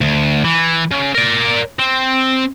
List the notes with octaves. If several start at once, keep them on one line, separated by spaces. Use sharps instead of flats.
D2
E3
C#3
A#4 D5
C4